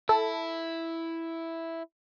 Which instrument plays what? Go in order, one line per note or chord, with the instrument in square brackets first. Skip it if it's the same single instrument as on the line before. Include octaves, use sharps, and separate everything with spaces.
[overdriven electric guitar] E4 [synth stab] A4